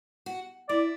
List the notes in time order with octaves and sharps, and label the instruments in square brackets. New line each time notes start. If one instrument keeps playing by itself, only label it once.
[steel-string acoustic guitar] F#4
[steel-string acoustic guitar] E4 [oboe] D5